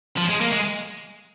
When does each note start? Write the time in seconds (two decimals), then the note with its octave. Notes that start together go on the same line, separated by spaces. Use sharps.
0.18 F3
0.29 G#3
0.41 A#3
0.52 G#3